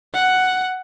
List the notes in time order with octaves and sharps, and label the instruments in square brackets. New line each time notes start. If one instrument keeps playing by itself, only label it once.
[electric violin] F#5